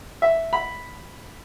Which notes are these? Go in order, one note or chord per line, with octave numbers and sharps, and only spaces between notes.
E5
B5